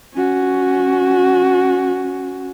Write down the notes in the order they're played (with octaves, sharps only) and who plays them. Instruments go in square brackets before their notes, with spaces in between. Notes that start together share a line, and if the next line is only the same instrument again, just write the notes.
[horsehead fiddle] C#4 F#4